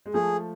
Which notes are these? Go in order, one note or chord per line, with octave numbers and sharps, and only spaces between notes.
G#3
F3 A3 G#4